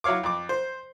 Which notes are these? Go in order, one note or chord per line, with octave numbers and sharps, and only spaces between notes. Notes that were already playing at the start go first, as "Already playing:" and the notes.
F#3 E4 C#5 F5 D6
F2 D6
C5